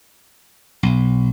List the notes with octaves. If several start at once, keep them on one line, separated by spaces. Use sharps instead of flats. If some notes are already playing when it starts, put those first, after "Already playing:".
B1